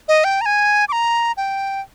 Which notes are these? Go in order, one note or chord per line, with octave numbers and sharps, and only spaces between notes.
D#5
G5
A#5
G#5
D6
A#5
G5